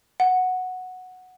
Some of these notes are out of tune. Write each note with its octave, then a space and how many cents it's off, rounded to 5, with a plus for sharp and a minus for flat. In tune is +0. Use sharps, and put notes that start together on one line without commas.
F#5 -5